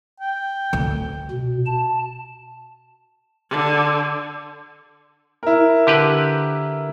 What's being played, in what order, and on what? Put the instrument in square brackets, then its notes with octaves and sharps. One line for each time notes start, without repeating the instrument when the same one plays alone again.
[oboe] G5
[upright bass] D2
[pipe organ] B2
A5
[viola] D3
[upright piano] E4 A#4
[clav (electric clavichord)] D3 G4 B4